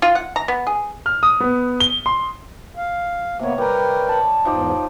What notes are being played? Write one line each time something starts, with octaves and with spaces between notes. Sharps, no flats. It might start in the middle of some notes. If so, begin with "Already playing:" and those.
F4
F#5
A#5
B3
G#4
F6
D#6
B3
G7
C6
F5
C3 A#3 B3 C#5
G3 A#4 B4 G5 A#5
A5 B5
E2 G#2 F3 D#4 G4